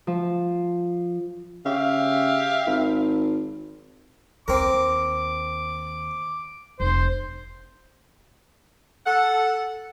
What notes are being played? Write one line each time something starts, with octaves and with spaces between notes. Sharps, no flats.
F3
C#3 G4 E5 F5
G#1
D#2 C4 A#4 D6
F1 C5
A4 F#5